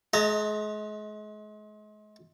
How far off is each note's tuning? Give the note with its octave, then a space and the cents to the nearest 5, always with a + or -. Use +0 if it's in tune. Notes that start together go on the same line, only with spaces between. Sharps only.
G#3 +35 D#5 +15 A#5 -30